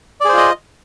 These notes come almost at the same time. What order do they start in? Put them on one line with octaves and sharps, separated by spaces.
D5 G#4 C5 F4 D#5